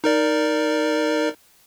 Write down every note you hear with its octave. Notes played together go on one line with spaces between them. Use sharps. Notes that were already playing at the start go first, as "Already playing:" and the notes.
D#4 A#4 D5